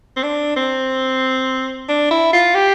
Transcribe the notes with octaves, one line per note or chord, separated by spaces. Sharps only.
C4
D4
C4
D4
E4
F4
G4